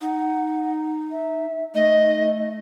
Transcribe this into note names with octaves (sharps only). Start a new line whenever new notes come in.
D#4 F#5
E5
A3 D#4 D#5